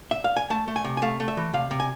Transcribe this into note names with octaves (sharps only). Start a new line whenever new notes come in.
E5
F5
G#5
A3 A5
A3
G#5
C3
G#5
A3 F5
A3
E5
E3
C3 F5
C3
G#5